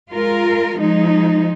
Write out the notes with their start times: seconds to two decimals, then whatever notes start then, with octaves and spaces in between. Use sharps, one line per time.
0.10 G#3 F4 A#4
0.78 F3 G#3 D#4